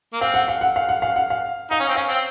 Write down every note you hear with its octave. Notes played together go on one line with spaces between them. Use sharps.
A#3
C4 F5
F#5
F5
F#5
F5
F#5
F5
F#5
F5
D#4 F5
C#4
C4
C#4 F5
C4